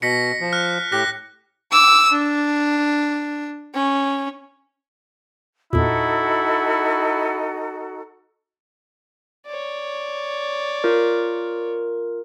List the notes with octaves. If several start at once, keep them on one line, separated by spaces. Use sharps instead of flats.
B2 A#6 B6 C#7
F3
F6 F#6
A2 G4 F#6 A#6
D6 E6
D4
C#4
E2 A#2 D#4 E4 F#4 A4
C#5 D5
F4 A#4